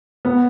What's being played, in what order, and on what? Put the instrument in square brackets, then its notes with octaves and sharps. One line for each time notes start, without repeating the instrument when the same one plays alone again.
[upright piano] B3